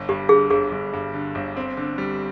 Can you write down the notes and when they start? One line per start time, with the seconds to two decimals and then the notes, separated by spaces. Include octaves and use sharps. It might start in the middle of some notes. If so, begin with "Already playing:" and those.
Already playing: G1
0.08 G2 G4
0.29 D3 G#4
0.50 G1 G#4
0.72 G1
0.93 G2
1.14 D3
1.35 G1
1.57 C4
1.77 D3
1.98 G3